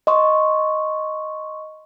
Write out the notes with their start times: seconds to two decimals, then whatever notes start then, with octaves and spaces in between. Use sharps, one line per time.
0.07 D#5 C6 C#6